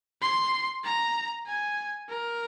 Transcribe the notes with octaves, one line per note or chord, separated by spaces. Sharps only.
C6
A#5
G#5
A#4